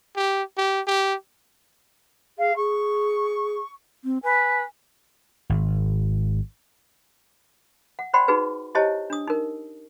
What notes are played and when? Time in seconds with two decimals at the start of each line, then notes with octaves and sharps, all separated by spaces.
0.16 G4
0.58 G4
0.87 G4
2.38 G#4 F5
2.56 G#4 C#6
4.05 C4
4.23 B4 G#5
5.50 G#1
7.99 F#5
8.14 C5 D5 F#5 G5 B5 C6
8.28 D#4 F#4 G#4 B4
8.75 E4 G4 C5 C#5 D#5 A5
9.10 D4 D#6
9.28 D#4 A#4